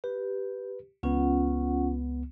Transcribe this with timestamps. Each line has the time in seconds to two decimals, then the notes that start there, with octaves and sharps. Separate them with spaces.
0.04 G4 B4
1.03 C#2 B3 C#4 F4 F#5